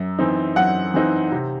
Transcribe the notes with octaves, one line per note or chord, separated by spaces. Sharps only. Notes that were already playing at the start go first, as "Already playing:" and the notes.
Already playing: F#2
E3 C4 D#4
F#2 F#5
E3 C4 D#4
C3